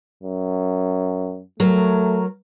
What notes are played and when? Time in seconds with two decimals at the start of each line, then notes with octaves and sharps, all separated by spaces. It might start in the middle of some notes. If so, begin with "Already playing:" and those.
0.23 F#2
1.60 F#3 A3 A#4